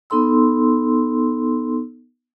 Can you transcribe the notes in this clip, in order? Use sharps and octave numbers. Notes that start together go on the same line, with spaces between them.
B3 D#4 A4 C6 E6